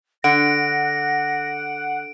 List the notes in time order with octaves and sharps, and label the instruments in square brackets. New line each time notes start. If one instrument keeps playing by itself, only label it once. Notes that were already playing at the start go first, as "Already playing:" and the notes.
[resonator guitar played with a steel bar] D3 [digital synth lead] F#5 [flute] A#6 [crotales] D7